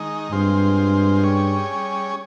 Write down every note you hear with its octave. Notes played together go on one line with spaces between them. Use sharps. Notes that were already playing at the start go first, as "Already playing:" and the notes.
Already playing: D#3 G#3 D#4
G2 G#3 C4 F4 C5
G3 C#4 G#4 C#5